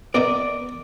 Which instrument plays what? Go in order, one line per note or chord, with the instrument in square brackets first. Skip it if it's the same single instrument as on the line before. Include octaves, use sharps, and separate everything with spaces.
[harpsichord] B3 A#4 D#5 [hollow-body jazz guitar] D5